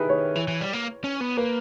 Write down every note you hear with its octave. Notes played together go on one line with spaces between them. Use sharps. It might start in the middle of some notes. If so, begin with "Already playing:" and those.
Already playing: D#3 E4 G4 G#4 B4
C#5
E3
E3
G3
A#3
C#4
B3
A#3 B4